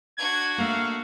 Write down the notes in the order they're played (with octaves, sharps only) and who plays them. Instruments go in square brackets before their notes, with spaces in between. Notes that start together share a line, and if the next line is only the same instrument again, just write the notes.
[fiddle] D4 F#4 [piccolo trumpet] G#6
[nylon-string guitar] A3 A#3 [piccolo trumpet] F5